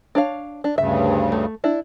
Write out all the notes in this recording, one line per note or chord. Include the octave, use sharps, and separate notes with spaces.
D4 C#5 F5
D4
D2 G2 C#3 E5
A3
D4 E4